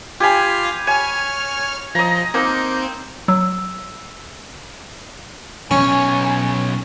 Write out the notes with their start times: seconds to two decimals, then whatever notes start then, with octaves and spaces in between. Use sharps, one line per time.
0.20 F4 G4 F5 G#5 B5
0.87 C#5 G#5 F6
1.95 F3 D#5 A#5
2.34 A#3 C4 D#4
3.28 F#3 E6
5.71 B1 C#4 C#5 G#5